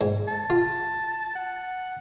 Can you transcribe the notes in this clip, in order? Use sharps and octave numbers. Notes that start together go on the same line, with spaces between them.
G#2
A5
F4
F#5